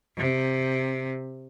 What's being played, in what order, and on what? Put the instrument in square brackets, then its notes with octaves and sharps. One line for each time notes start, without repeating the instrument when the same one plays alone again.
[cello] C3